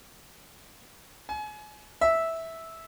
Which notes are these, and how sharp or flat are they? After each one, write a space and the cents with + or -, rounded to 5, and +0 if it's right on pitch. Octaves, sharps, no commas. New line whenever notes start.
G#5 +30
E5 -10